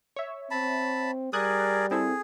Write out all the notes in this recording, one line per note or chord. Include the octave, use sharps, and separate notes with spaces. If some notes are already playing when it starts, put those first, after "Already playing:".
C#5 E5
C4 A5 B5
G3 G#4 A#4 D5 D#6 F#6 G#6
C4 E4 G#4 A4